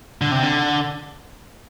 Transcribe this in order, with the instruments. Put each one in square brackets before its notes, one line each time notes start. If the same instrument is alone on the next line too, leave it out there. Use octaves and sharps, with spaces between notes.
[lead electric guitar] D3
C3
D3